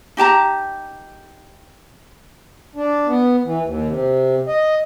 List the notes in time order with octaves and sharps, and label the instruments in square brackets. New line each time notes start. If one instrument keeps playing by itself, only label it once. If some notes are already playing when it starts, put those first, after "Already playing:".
[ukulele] D#4 G4 A5 A#5
[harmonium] D4
B3
E3
D#2
C3
D#5